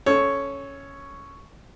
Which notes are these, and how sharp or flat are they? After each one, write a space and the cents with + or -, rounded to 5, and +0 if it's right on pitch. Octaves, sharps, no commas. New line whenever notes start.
C#4 +0 A4 -15 C#5 +0